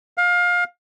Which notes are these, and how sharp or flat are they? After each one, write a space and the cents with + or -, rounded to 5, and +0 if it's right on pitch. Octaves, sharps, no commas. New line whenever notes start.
F5 +25